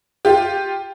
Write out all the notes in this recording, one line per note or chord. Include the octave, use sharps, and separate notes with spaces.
F4 G4